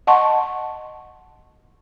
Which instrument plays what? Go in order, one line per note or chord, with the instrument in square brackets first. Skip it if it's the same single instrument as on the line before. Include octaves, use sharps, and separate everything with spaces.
[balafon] D#5 F#5 A5 C6 C#6